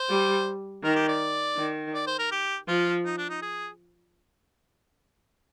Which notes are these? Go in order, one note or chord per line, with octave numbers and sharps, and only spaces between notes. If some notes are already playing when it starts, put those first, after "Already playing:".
Already playing: C5
G3
D#3 A#4
G4
D5
D#3
D5
C5
A#4
G4
F3 F4
D#4
D4
D#4
G#4